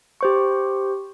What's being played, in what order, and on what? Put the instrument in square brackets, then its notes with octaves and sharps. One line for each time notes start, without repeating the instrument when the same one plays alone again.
[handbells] G4 C5 C#6